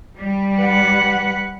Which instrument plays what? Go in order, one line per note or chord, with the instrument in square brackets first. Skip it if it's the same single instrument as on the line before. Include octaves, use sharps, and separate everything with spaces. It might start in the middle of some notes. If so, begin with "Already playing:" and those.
[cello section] G3
[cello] B4 F#5